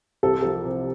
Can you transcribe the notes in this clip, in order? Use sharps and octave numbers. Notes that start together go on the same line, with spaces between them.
C2 A4
G4
F3 A4
C3